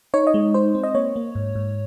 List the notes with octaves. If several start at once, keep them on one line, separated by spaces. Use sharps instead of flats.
D#4 C#5
D#5
G#3
D#4 C5
C4
D#5
A#3 C#5
A#3
G#2
G#2